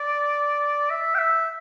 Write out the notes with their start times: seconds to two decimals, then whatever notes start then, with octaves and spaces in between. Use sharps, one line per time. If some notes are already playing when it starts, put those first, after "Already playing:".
Already playing: D5
0.90 E5
1.14 G5
1.19 E5